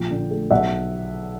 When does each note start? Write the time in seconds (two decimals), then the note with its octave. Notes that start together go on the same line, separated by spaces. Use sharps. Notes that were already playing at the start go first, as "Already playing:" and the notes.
Already playing: A#1 F3 G5
0.10 D3
0.30 A3
0.51 B1 E5 F#5